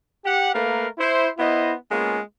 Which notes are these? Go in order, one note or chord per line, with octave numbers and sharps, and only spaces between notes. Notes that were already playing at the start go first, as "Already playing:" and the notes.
G4 F#5
A3 A#3 A#4 B4 F5
E4 C5
B3 E4 C5 D#5
G#3 A#3 B3 C#4 F4